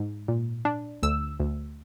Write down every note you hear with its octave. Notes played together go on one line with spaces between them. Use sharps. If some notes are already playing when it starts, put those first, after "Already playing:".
Already playing: G#2
A#2
D4
D2 E6
D2